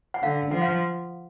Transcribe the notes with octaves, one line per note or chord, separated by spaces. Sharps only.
F#5
D3 F5
F3 F#5
F5